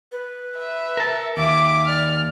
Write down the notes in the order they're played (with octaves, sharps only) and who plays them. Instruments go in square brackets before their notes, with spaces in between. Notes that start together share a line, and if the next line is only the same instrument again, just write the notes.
[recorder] B4
[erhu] E5
[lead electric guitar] A#4 A5
[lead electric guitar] D#2 [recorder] E5 [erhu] D6
[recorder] D5 [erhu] F6